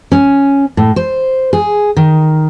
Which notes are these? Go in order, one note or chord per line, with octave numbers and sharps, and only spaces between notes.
C#4
A2
C5
G#4
D#3